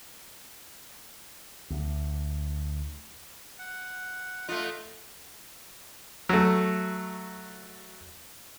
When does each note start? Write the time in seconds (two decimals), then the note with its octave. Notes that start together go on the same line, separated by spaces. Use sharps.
1.70 D2
3.59 F#5
4.49 A3 F4 D#5 F#5 A#5
6.29 F#3 A3